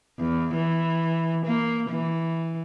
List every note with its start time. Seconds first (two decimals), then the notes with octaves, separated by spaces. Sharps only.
0.18 E2
0.54 E3
1.45 A#3
1.90 E3